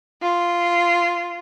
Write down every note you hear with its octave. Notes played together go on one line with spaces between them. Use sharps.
F4